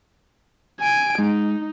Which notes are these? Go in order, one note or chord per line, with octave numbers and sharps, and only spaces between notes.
G#5 D7
G#3 D#4